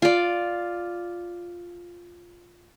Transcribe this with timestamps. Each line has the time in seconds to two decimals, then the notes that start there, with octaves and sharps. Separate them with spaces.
0.02 F4 D5